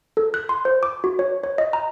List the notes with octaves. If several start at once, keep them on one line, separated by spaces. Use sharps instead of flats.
A4
F#6
C6
C5
D6
F#4
C#5
C#5
D#5
A#5